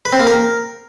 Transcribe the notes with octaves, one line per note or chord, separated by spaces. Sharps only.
B4
C4
A#3
A#4